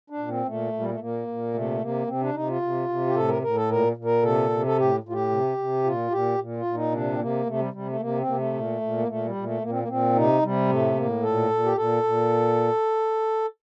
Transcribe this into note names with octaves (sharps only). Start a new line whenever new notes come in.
D4
A#2
C4
A#2 A3
A#2
G3
A3
A#2 A#3
A#2
C3 A3
C3 A#3
C3 C4
D4
C3 D#4
F4
C3
C3
G4
A2 A4
A#4
A2 A#4
A4
A#2 A#4
A#2
A#4
C3 A4
C3
A4
A2 G4
A2
F4
G4
C3
C3
A#2 F4
A#2 G4
A#2
F4
A#2
D#4
C3 D4
C4
C3 A#3
C3 A3
G3
C3 G3
A3
C3 A#3
C4
C3 A#3
A3
A#2
A#2
A#3
A#2 A3
G3
A#2
A3
A#2 A#3
C4
A#3
A#2 C4
C3 D#4
C3 G3
A2 A3
A2 A#3
A#2 A4
A#2
G4
A#2 A4
A#2